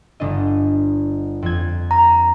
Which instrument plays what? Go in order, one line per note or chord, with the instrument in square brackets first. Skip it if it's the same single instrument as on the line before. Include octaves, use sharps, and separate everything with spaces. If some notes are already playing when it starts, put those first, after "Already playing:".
[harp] G1 D4 D#5
F2 G#6
[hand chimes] A#5